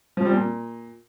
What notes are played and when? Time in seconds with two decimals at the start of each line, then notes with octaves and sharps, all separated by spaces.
0.17 F3
0.25 G3
0.33 A#2